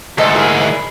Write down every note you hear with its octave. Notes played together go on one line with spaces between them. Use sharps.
D2 G#2 A4 D#5 C6
A#3 E4 G#4